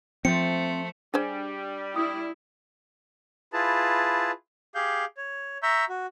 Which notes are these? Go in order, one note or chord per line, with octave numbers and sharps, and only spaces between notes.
F3 A3 C4 C#7
G3 D4 G#4 C5 G#5
E4 D#6
E4 F4 G#4 B4 A5
G4 G#4 F5 G6
C#5
E5 A#5 C#6 E6 G6
F#4